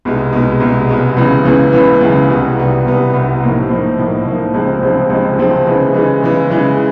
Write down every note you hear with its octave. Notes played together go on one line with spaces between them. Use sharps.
C2 B2 G#3
C2 B2 G#3
C2 B2 G#3
C2 B2 G#3
C#2 C#3 E3
C#2 C#3 E3
C#2 C#3 E3
C#2 C#3 E3
C2 B2 G3 B3
C2 B2 G3 B3
C2 B2 G3 B3
C2 B2 G3 B3
A2 F3 A#3 D#4
A2 F3 A#3 D#4
A2 F3 A#3 D#4
A2 F3 A#3 D#4
C#2 C3 F3 G#3 C4
C#2 C3 F3 G#3 C4
C#2 C3 F3 G#3 C4
C#2 C3 F3 G#3 C4
C#3 E3 G#3
C#3 E3 G#3
C#3 E3 G#3
C#3 E3 G#3